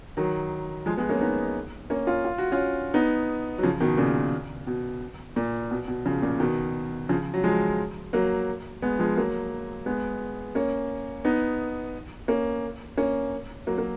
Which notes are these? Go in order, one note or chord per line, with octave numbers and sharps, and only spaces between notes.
D#3 F#3
F3 G#3
G#3 B3
A#3 C#4
B3 D#4
A#3 C#4
C#4 F4
F4
F#4
C#4 F4
B3 D#4
F#3
C#3 F3
B2 D#3
A#2 C#3
B2
A#2
B2
B2
C#3 F3
A#2 C#3
B2 D#3
C#3 F3
F#3
F3 G#3
F#3 A#3
G#3 B3
F3 G#3
F#3 A#3
G#3 B3
A#3 C#4
B3 D#4
A#3 C#4
A#3 C#4
F#3 A#3
F#3 A#3